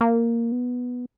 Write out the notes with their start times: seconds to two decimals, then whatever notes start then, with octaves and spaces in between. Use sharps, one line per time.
0.01 A#3
0.52 B3